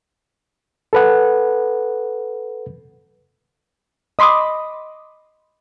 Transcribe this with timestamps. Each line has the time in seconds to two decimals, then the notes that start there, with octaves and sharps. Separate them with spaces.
0.93 A4 B4 F#5
4.19 D#5 B5 C6 D6 D#6